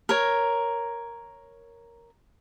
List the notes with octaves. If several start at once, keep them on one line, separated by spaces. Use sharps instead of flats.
A#4 C#5